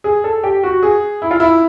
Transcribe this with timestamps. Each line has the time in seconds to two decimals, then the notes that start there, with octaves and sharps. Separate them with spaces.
0.04 G#4
0.24 A4
0.43 G4
0.63 F#4
0.83 G#4
1.22 E4
1.31 F4
1.40 E4